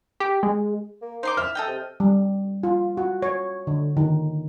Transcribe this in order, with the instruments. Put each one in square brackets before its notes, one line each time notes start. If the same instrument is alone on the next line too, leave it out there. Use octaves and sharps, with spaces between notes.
[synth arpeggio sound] G4
G#3
[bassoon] A#3
[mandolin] D#4 C6 D6 [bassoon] C5
[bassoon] E4 [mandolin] E5 [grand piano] F6
[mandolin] A4 D#5 G5
[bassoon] C3
[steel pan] G3
F4
F#4
C#5
D3
D#3